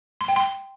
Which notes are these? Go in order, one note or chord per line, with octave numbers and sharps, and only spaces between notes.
C6
G5
C6